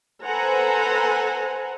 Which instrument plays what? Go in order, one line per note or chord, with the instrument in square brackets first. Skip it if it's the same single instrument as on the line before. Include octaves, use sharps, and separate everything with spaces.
[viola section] A4 B4 C5 F#5 G#5 A#5